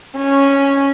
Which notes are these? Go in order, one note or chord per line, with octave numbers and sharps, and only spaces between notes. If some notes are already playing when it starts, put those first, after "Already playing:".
C#4